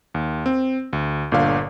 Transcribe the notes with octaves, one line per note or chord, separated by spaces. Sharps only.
D#2
C4
D2
G1 A#2 D3 F5